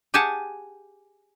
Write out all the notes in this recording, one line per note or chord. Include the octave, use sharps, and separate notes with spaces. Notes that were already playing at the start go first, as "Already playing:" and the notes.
G4 G#4 F#5 G#5 A5